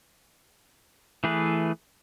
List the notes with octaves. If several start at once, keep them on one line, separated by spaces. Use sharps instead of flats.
E3 A3 G#4 B4